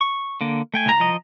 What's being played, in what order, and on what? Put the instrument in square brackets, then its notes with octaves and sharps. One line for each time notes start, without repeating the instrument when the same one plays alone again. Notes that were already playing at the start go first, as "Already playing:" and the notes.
[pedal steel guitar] C#6
D3 A#3
A3 G5 G#5
[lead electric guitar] C2 A#5
[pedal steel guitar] F3 D#5